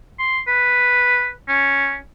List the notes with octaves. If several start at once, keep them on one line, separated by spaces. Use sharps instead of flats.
C6
B4
C#4